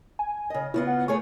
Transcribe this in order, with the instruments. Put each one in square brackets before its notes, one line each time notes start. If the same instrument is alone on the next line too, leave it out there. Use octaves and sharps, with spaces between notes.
[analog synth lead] G#5
[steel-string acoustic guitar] C#3 D#5
[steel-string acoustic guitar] C#3 B3 F4 [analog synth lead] E4
[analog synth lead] F#5
[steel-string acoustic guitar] A3 G#4 C#5 [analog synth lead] C#6